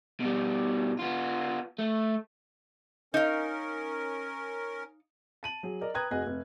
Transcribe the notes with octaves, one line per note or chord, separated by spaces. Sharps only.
B2 G3
B3 F4
A3
C#4 D#4 A#4 F5
A5 D#7 F#7
F#3 G#4
A#4 D5 D#5
B4 G5 A#5 D#6 F#6 G#6
F1 F#4 G#4 D#5 G#5 F#6
F1